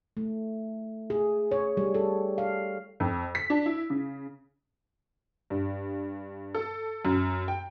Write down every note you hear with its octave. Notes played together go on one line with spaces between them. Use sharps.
A3
G#4
C#5
G3
A4
F5
F2
B6
D4
E4
C#3
G2
A4
F#2
G5